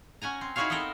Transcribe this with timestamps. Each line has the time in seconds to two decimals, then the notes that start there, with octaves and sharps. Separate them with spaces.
0.22 C#4 F#5 G#5 A#5
0.41 C4
0.56 D#4 E4 F#4 G#4 C#5 F5
0.70 B3 C4 D#4 A4 A#4